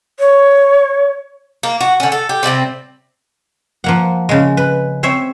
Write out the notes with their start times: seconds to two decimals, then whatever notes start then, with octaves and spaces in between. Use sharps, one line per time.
0.19 C#5
1.63 A#3
1.81 F#4
2.00 D3 C#4
2.12 A4
2.29 G4
2.43 C3 G3 A#3 C4
3.84 F3 A#3 F#5
4.29 C#3 G#3
4.57 B4
5.03 C4 C5 C#5 E5